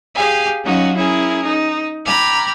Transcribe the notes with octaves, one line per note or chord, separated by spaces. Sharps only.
G4 G#4 F5 G#5
F#3 C#4 D#4 F4 F#4
C#4 E4 G#4 A#4
D#4
G5 A#5 B5 D6 F6 G#6